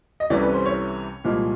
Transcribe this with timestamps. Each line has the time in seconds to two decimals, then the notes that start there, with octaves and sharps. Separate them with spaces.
0.20 D#5
0.30 C2 C3 E3 A3 C#4 D5
0.42 B4
0.54 C5
0.66 C#5
1.24 C2 A#2 F3 G#3